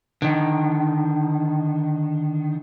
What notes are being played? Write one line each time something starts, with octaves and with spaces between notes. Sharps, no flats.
D3 D#3